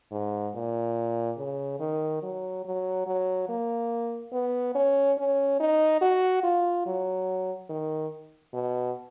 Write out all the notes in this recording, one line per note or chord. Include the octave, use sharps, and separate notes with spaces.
G#2
A#2
C#3
D#3
F#3
F#3
F#3
A#3
B3
C#4
C#4
D#4
F#4
F4
F#3
D#3
B2